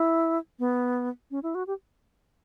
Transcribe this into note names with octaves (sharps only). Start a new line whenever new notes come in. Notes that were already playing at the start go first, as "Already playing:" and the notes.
Already playing: E4
B3
C#4
E4
F#4
G4